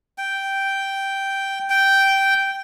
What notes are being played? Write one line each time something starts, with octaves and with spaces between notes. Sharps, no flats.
G5
G5